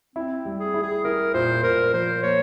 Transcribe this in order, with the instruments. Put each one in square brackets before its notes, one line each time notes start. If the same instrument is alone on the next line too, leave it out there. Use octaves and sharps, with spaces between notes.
[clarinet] C4 [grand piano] E4
[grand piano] G3
[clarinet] G#4
[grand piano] E4
[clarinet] G#4
[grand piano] E4 [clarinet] A#4
[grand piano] A#2 [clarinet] C5
[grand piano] A#2 [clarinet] A#4
[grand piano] F3 [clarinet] C5
[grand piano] A#3 [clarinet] C#5